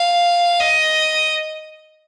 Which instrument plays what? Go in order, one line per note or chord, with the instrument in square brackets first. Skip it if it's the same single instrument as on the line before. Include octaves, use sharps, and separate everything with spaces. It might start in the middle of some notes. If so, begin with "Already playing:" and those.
Already playing: [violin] F5
D#5